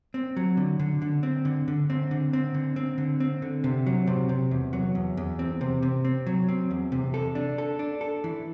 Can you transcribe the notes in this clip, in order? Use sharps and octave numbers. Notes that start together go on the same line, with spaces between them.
C4
F#3
D3
D3
D3
C4
D3
D3
C4
D3
C4
D3
C4
D3
C4
D3
C3
F#3
C3
C3
E2
F#3
E2
E2
C4
C3
C3
C4
F#3
C4
E2
C3
A4
D4
A4
D4
A4
E3